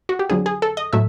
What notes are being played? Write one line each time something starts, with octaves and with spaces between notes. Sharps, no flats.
F#4
G4
F2 D3 F#3 G#4
G#4
A4
D#5
A2 F#3 A3 E5